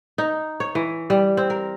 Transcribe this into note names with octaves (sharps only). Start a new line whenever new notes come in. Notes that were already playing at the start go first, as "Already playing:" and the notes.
D#4
C#5
E3
G3
C4
A#4